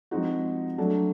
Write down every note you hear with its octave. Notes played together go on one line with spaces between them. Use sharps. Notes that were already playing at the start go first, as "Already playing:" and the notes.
F3 G#3 C4 D#4 F#4
F#3 A3 D4